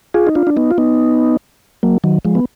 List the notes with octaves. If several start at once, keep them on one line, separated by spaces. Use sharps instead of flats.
F4 G#4
D#4
D4 F4
D4
B3 D#4
F4
B3 D#4
F#3 A#3
D#3 F#3
F3 G#3
B3